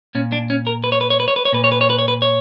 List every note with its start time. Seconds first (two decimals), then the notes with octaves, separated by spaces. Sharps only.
0.15 A#2 C#4
0.32 D4
0.50 C#4
0.67 A#4
0.84 B4
0.92 C#5
1.01 B4
1.10 C#5
1.20 B4
1.28 C#5
1.36 B4
1.45 C#5
1.53 A#2 B4
1.64 C#5
1.72 B4
1.81 C#5
1.90 B4
1.98 C#5
2.08 B4
2.22 C#5